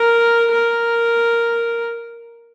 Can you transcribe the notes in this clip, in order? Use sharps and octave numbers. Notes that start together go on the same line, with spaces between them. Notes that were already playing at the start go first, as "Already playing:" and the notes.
Already playing: A#4
A#4